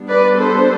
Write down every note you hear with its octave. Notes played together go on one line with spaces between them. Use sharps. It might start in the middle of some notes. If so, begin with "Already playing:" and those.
Already playing: G3 B3 D4
B4 D5
A4 C5